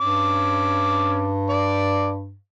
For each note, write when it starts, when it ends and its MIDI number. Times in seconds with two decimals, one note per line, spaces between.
0.01 2.37 43
0.01 1.31 61
0.01 1.31 86
1.50 2.10 74